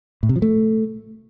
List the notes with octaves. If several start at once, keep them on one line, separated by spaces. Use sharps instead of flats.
A2
C3
F3
A3